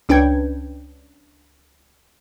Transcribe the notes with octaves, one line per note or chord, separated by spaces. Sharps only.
C#2 C#4 D4 B4 G5 G#6